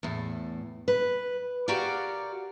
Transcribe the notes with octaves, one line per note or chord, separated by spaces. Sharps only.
E2 A2
B4
F#4 G4 A#4 D5 F5